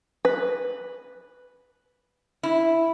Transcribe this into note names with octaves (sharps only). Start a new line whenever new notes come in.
B4
E4